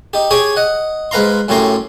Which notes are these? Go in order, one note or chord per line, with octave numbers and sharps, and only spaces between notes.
D#4 G4
G4 G#4 C#5 G5 G#5
D#5 F#5
G#2 B4 F5 A#5 C6
F#2 A2 C#4 G4 A#5 C6